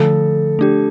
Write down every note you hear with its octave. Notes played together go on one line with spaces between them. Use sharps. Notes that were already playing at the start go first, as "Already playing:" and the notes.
Already playing: D3 F3 A3 A4
A3 D4 G4